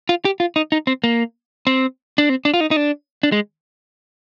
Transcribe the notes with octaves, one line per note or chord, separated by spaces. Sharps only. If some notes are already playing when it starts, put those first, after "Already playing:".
F4
G4
F4
D#4
D#4
C4
A#3
C4
D4
C4
D4
F4
D#4
D#4
D4
D4
G#3